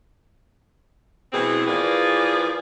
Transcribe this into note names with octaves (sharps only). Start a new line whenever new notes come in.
B2 E3 G#3 C4 E4 G#4
E3 F3 A#3 G#4 B4 D5